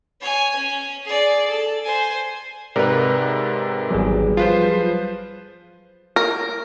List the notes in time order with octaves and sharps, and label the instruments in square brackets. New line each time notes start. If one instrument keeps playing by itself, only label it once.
[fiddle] C#5 G#5
C#4
G#4 D5
A4
C5 G#5
[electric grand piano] G#2 C3 [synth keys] A#4 B4 [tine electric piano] D5
[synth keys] G#1 E2 [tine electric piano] F#3 G3 G#4
[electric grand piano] F3 B4 C5 [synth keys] F4
[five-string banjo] A#4